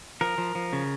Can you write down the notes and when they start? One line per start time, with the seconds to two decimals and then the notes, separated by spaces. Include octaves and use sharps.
0.21 F3 A#4
0.38 F3
0.55 F3
0.73 C#3